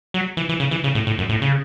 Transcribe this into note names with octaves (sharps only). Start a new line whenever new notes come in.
F#3
E3
E3
C#3
E3
C#3
A2
A2
F#2
A2
C#3